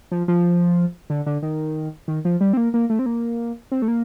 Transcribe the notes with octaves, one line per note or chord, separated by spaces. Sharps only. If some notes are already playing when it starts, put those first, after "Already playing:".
F3
F3
D3
D3
D#3
D#3
F3
G3
C4
A#3
A#3
A3
C4
A#3
C4
A3
A#3